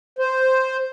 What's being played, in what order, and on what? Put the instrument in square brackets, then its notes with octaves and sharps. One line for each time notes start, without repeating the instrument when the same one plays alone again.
[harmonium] C5